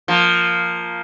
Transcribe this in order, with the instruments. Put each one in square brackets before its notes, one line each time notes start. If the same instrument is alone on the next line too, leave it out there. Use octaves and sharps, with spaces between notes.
[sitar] F3 A#3